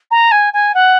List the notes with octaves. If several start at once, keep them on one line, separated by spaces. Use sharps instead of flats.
A#5
G#5
G#5
F#5